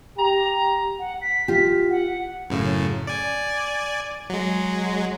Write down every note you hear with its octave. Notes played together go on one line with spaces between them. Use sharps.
G4 A#5
F#5
B6
F4 G4
F#5
F#2 A2 C#3
D5 G#5
F#3 G#3